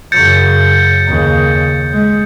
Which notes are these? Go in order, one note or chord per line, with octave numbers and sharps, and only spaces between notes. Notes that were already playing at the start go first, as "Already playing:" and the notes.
F#2 C#3 G6 A6 C#7
D#2 C#3
G#3